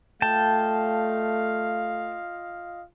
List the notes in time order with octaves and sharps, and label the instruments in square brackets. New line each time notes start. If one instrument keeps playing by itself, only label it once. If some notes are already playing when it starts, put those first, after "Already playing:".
[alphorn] A3 [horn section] F4 D#5 F5 [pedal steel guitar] G5 A5